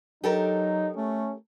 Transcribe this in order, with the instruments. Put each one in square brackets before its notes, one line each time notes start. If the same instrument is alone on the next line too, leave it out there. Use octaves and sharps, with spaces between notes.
[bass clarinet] F#3 [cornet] D#4 [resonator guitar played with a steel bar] G4 A4 A#4
[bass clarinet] A3 [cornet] C#4